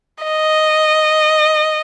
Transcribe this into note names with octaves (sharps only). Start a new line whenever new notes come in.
D#5